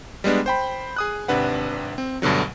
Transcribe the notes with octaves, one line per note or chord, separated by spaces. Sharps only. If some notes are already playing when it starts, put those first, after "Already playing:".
G3 G#3 B3 D4
C5 G5 B5
G#4 D#6 F#6
G#1 C3 D4 B4 F#5
C4
D2 G2 B2 D3 F#3